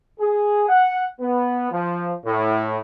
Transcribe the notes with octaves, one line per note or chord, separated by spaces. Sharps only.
G#4
F#5
B3
F3
A2